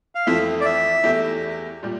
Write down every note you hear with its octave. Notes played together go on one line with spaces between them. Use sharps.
F5
F2 E3 A3 C4 E4 E5
D5
E5
E2 E3 A3 E4 G4
A#2 G3